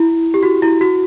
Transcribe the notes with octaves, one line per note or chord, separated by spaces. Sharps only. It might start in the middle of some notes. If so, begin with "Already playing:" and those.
Already playing: E4
G4
F#4
E4
F#4